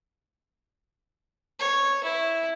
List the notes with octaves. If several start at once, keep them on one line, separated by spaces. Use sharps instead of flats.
C#5
E4